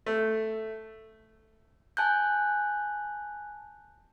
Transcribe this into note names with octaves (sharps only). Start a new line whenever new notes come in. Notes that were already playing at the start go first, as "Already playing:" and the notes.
A3
G#5 A5 F#6 G6